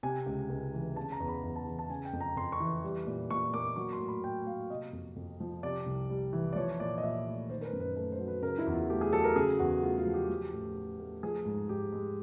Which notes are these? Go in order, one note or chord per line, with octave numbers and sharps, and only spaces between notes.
C3 G#5
C#2
C#2
E3
C#3 A5
A#5
E2
B5
E2
A5
E3
A5
C#3 G#5
G5
F2
A#5
F2 C6
C#6
E3
G3
A#2
A#2 C#6
A#3 D6
F#3 C#6
C6
A2
B5
A2 G5
A#3 F5
C3 D#5
F2
F2
F3
C3 D5
C2
G3
E3
D5
F3 C#5
A#2 D5
D#5
A#2 E5
A3
D#3 C5
A#4
B4
F#2
B4
A3 B4
C5
F#3
B4
C#3 A#4
E4
E2
F4
A3 G4
G#4
F#3 A4
A#4
C#3 G#4
E2 F#4
A3 F4
F4
F3
G4
F3
A2
A2
A3
F3 G#4
G#2
G#2 G4
G#3